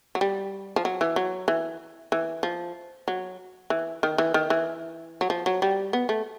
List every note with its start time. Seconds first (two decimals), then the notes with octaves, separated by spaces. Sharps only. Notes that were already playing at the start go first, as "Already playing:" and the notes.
0.15 F#3
0.21 G3
0.76 F3
0.85 F#3
1.01 E3
1.16 F#3
1.48 E3
2.12 E3
2.43 F3
3.08 F#3
3.70 E3
4.03 D#3
4.18 E3
4.34 D#3
4.50 E3
5.21 F#3
5.30 F3
5.46 F#3
5.62 G3
5.93 B3
6.09 A3